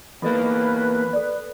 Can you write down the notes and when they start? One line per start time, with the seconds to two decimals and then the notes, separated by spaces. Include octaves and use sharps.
0.22 E2 A#3 F4 A4 B4 D#5
1.13 A4 D5